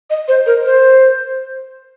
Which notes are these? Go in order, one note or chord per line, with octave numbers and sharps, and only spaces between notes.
D#5
C5
A#4
C5